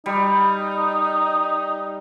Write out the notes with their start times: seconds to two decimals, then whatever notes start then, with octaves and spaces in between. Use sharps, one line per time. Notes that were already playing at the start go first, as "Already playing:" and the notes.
0.06 G3 D#4